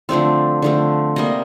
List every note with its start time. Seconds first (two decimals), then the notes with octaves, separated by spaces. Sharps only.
0.09 D3 F3 A3 C4 D5
0.62 D3 F3 A3 C4
1.16 C3 G3 A#3 D#5